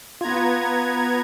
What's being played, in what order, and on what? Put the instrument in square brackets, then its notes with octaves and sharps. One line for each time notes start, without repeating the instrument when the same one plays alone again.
[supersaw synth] B3 A#5 G#6 [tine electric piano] F4